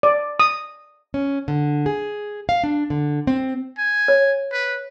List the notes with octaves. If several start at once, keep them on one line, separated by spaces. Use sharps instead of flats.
D5
D#6
C#4
D3
G#4
F5
D4
D3
C4
G#5
C#5
B4